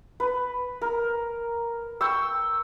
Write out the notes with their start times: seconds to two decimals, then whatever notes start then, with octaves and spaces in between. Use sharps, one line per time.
0.20 B4
0.82 A#4
2.01 G5 C#6 E6